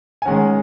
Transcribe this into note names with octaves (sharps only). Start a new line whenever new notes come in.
G#5
D#3 G#3 C#4 F#5
G#5